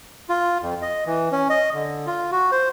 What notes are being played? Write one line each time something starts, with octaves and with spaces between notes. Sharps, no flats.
F4
F2
D#5
E3
C#4
D#5
D3
F4
F#4
C5